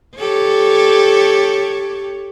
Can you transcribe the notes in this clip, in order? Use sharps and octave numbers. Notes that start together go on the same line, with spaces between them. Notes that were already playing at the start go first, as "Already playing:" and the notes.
G4 A4 C#5